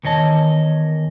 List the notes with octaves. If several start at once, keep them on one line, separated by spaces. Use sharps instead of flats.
E2 D#3 C#5 D#5 A5